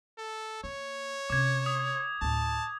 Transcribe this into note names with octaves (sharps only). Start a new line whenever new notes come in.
A4
A#3 C#5
C3 C#4 D6 G#6
D#6
D2 A2 A5